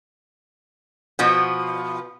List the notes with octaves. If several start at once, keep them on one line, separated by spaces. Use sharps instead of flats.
B2 F3 B3